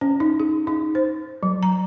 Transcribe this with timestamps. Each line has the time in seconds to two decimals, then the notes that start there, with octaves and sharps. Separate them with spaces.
0.01 C#4
0.20 D#4
0.40 G#4
0.67 D#4
0.95 C5
1.43 F#3
1.63 A#5